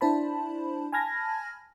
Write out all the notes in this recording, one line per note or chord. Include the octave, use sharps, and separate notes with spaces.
D4 E4 C5 A5 B5
G#5 A5 B5 F6 G#6 A#6